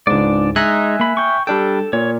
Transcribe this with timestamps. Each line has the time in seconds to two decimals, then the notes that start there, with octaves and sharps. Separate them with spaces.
0.07 C#2 G#2 D4 D5
0.56 G#3 D#4 E5 G#5 A#5 F#6
1.00 A#3 B5
1.17 G5 C#6
1.47 G3 D4 A4 G5
1.93 A#2 C#5